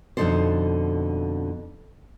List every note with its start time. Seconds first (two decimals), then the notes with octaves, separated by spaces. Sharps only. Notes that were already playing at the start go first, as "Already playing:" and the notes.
0.17 F2 B2 D3 D#4 A4 C5